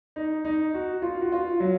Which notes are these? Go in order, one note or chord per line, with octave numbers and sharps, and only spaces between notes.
D#4
D#4
F#4
F4
F#4
F4
F#3